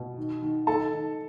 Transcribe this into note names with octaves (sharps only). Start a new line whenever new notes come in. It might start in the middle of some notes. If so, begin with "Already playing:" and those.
Already playing: B2
D#3
D#3
D#3 A4 A5
D#3